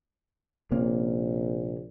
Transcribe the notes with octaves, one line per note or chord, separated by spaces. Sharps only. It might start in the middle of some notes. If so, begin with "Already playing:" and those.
A#1 C3 A#3 C#4